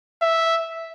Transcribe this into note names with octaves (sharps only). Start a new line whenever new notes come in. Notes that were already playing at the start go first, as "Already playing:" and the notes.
E5